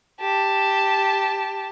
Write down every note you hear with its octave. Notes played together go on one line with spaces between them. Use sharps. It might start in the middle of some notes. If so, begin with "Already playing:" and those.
G4 A5